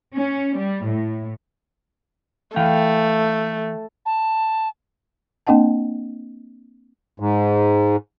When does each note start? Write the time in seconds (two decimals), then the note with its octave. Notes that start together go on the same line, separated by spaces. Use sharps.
0.16 C#4
0.58 G3
0.88 A2
2.56 E3 A3 F5 G5
4.06 A5
5.47 A#3 C4 D4 D#5 F#5 A5
7.20 G#2